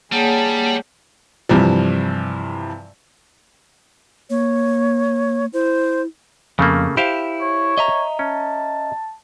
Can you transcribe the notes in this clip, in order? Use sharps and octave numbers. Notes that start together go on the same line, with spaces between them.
G3 A#3 G#4 C#5 F#5 A5
G2 C3 E3 F3
A#3 C#5
E4 C5
F2 C#3 A3 A#3
E4 G4 C5 F5
C#5
D#5 E5 A#5
C#4 A5